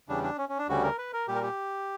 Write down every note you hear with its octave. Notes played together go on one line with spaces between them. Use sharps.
E2 C#3 G3 D4
D4
C#4
C#4
D4
D2 C#3 G3 F#4
A#4
B4
A#4
A#2 G3 G4
A#4
G4